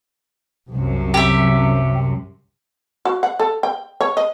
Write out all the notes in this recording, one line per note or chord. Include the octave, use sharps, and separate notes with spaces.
C2 F#2 C3
G4 E5
F#4
F#5
A4
G5
C#5
D#5